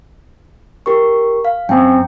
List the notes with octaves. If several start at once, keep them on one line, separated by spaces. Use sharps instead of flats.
G4 A#4 C#6
F5
F#2 C4 C#4 G5